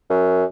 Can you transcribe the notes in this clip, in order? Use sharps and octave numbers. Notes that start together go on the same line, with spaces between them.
F#2